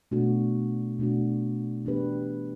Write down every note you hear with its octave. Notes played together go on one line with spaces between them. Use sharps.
B2 A3 D4 F#4
B2 A3 D4 F#4
E3 B3 D4 G4 B4